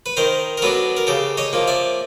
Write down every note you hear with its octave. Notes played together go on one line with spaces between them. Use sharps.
B4
D#3 A#4 C5
A#4
F#3 B3 D4 A4 B4
A#4
C#3 G4 A4
C#5 D#5
F3 A#3
D5 E5